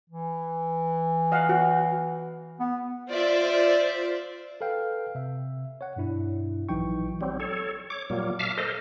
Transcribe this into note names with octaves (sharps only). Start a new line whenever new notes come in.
E3
D#5 F5 F#5
F#4
B3
F4 C5 D5 E5
A4 B4 F5 G5
C3 E5
C#5 F#5
G2 B2 D4 E4
A#1 E3 F#3 D#4 G5 C#6
F#3 G3 C4
A4 C#5
C#5 D6
A#2 F#3 G3 A#3
E5 F5 A5 D6 F6
A4 A#4 C5 D#5